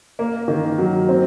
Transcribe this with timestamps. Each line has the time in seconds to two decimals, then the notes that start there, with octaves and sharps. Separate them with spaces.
0.19 A#3
0.48 D#3
0.78 F#3
1.09 C4